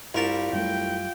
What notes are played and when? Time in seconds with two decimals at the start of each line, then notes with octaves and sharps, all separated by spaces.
0.15 C2 G2 G3 F4 A#4 A5
0.53 F#2 G3 A3 G5